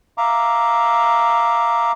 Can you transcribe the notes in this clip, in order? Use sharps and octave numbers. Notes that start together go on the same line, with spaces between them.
E5 F5 A#5 D6